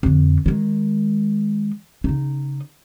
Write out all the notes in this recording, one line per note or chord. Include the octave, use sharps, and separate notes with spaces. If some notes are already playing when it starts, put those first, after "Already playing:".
F2 D3
D#3 G#3
C#3 D#4